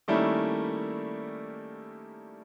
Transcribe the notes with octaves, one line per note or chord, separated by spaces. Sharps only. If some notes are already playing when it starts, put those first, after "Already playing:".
D#3 G3 A3 A#3 C#4 E4